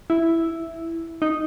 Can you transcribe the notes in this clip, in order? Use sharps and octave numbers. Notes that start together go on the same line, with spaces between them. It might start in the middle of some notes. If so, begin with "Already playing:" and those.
E4
D#4